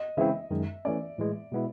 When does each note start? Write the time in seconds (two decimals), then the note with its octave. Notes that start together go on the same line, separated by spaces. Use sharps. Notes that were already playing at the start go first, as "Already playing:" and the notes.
Already playing: D#5
0.17 C#3 E3 G#3 C4 E4 E5
0.51 F#2 D#3 G#3
0.85 E3 A3 C#4 D5
1.18 A2 E3 G#3
1.52 B2 G#3 B3 E4